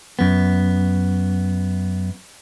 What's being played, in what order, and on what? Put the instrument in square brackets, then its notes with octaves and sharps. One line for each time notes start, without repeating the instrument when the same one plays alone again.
[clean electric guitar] F#2 B3